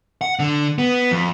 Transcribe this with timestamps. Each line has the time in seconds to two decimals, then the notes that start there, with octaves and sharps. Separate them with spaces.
0.21 F#5
0.39 D3
0.78 B3
1.11 F2